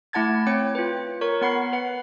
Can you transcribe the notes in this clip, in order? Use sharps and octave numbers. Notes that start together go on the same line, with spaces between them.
A3 E4 F#5 A5 G#6 A6
C4 C#5 G5 C#7
F4 B4
A#4 C#5 C#6
B3 F#5 B5 C7
B4 F#5